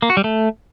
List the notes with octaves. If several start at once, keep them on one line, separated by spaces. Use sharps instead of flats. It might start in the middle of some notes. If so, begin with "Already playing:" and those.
A#3
F#4
G3
A3